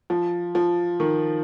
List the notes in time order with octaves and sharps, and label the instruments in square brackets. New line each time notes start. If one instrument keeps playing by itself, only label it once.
[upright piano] F3
F3
D#3